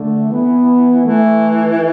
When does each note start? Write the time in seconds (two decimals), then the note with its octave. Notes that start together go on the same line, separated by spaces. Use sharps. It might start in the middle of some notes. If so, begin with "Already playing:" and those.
Already playing: D3 A3
0.31 E3 B3
1.04 E3 A3